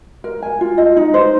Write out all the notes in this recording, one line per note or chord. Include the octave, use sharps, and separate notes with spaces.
A#4
G#5
F4
D#5
D#4
C5